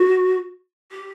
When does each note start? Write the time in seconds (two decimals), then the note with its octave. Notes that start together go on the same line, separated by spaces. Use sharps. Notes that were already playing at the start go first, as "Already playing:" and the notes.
Already playing: F#4
0.91 G4